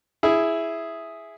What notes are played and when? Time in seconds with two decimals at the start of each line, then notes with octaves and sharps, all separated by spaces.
0.23 E4 G#4